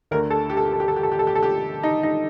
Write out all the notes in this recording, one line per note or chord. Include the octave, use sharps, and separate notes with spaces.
D2 D3 A3 A#4
A4
G4
A4
G4
A4
G4
A4
G4
A4
G4
A4
G4
A4
G4
D#4
D#4